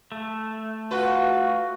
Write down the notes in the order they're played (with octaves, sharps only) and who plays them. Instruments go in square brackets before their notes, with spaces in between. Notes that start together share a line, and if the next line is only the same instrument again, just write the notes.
[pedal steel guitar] A3
[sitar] F4 B4 [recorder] F#4